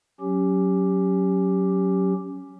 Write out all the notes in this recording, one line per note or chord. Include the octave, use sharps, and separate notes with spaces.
F#3 C#4 G4